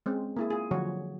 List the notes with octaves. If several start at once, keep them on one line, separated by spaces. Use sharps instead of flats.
G#3 C4 C#4
A#3 E4 G#4
F4 G#4
D3 F3 F#3 F4 F#4 C#5